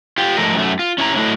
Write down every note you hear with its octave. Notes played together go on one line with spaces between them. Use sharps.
F4 G4
G#2 F3 A3 A4 A#4 D#5
F#2 A3
F4
C#4 E4 A#5
F#3 A3 D4 E4 A4 D#5